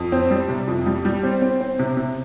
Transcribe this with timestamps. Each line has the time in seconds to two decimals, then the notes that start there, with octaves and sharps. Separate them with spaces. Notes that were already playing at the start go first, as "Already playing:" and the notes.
Already playing: F2
0.12 C4
0.31 G3
0.49 C3
0.68 F2
0.86 G3
1.05 G3
1.23 C4
1.42 C4
1.61 C4
1.79 C3
1.97 C3